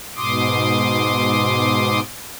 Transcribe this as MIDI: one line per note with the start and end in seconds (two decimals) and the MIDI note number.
0.16 2.00 44
0.16 2.00 47
0.16 2.00 84
0.16 2.00 86
0.16 2.00 87